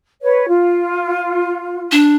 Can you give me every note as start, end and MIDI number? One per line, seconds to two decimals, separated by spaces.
0.22 0.46 71
0.22 0.46 73
0.47 1.92 65
1.92 2.16 62